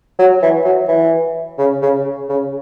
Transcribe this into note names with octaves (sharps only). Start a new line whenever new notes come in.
F#3
E3
F#3
E3
C#3
C#3
C#3